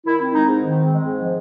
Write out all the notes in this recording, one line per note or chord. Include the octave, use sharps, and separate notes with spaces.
D#3 E4
C4
G#3 D#4
G#2
D#3
C4
G#3
G#2
F3